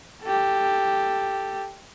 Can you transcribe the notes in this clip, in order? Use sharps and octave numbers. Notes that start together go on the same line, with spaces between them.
G4 A4